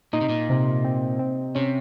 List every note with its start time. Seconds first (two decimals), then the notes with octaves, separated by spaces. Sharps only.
0.13 A#2 D#4
0.21 C3
0.29 A#2
0.49 C3
0.84 C4
1.19 C4
1.55 C3 C#4